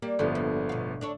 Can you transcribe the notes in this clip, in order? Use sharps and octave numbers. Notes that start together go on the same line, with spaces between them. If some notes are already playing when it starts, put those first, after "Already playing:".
G3 A#3
G1 A2 D3 F3 B3
A#3
B2 F5
D4 A4 C#5